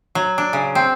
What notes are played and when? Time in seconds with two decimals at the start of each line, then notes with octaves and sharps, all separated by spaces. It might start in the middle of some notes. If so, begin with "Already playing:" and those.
0.15 F#3
0.38 D4
0.53 C#3
0.75 C4